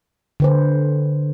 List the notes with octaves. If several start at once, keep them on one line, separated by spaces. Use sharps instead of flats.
D3 B4 C5